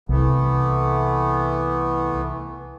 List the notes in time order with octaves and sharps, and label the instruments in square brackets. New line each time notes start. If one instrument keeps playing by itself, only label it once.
[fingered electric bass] C2 [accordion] E3 A3 B3